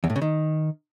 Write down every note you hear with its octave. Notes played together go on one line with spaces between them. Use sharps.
E2
A2
C#3
D#3